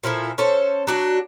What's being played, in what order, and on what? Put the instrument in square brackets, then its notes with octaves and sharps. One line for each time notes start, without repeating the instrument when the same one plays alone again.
[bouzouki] A#2 F3 E4 A4
C#4 A4 C5
F#3 D4 F#4